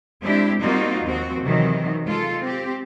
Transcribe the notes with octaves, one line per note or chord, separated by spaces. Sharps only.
G#3 C4 D4 E4 G4
G3 A#3 C4 D#4 F4 F#4
D#2 F3 C4 F#4
C3 D#3 E3 F#3
G#3 F4 A4
C4 G4